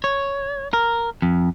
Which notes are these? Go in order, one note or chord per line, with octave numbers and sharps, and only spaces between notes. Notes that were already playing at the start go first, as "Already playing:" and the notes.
C#5
A#4
F2